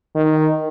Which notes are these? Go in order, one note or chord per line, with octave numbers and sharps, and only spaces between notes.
D#3